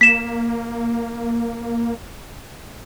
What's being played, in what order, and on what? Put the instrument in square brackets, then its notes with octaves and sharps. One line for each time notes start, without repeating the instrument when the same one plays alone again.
[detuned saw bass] A#3 [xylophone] B6 E7